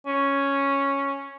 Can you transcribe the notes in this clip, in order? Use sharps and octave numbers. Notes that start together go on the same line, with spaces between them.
C#4